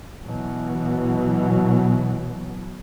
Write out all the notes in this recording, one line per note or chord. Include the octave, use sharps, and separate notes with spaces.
B2 E3 F#3